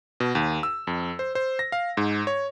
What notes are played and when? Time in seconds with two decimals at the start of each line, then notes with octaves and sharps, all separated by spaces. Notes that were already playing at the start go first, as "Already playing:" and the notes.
0.20 B2
0.35 D#2
0.63 E6
0.87 F2
1.19 C5
1.35 C5
1.59 A#6
1.72 F5
1.97 G#2
2.27 C#5